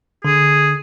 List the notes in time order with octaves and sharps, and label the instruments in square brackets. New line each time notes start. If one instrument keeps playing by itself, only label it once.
[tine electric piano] D3 [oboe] G#4